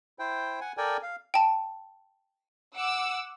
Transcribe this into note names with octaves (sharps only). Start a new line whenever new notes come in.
E4 C5 G5
F#5 G#5
A4 A#4 D5 G5 G#5
F5
G5 A5
F#5 D6 E6